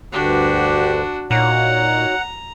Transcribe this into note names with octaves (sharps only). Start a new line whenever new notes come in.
D2 G2 D3 D4 F#4 G4
A#2 D#4 F#4 C#5 F#5 A#5